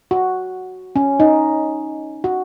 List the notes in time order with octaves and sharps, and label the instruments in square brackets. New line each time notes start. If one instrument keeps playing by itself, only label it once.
[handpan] F#4
C#4
D#4
F#4